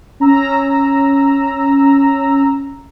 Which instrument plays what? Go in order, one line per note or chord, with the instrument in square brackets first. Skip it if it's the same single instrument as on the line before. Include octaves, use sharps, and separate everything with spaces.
[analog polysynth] C#4 A#5 E6